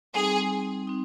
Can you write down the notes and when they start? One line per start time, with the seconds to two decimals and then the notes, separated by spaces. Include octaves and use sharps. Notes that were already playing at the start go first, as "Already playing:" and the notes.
0.14 G3 C4 D#4 G#4
0.87 C4 D#4